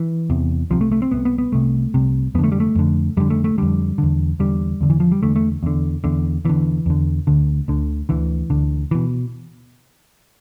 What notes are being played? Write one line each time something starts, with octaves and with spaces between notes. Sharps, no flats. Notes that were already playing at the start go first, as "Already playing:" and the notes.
Already playing: E3
E2 C3
C2 C3 F3
A3
A3
C4
C2 C3 B3
B3
B3
C2 C3 A3
C2 C3
F2 D3 A3 B3
G3
A3
F2 D3
F2 D3 G3
A3
A3
F2 D3 G3
E2 D3
E2 D3 G3
E2 D3
E3
F3
G3
E2 D3 A3
A3
E2 D3
E2 D3
E2 D3 E3
E2 D3
D2 D3
D2 D3
D2 D3 E3
D2 D3
B2 E3